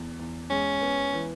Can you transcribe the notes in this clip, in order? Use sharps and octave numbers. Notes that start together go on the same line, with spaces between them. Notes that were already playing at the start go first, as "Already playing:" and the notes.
Already playing: E2
E2
G#3 C#4
B3
E3